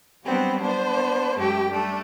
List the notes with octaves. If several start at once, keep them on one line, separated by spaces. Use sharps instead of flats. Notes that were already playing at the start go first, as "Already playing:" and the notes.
F#3 G3 B3 C4 D4
B3 D4 C5
F#2 G#3 A3 G4 G5
G3 A3 D4